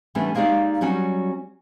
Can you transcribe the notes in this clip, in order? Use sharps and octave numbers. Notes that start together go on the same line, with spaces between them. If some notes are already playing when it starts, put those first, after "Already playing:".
E3 G3 A3 B3 C#4 D4
G#3 A#3 D#4 G4 D5 F5
F#3 G3 C#4 F#4